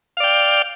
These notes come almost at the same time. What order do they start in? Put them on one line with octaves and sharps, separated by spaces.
F5 D5 G5